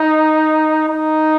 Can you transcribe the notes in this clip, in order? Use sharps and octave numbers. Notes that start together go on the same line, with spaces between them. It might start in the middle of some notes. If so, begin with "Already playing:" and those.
Already playing: D#4
D#4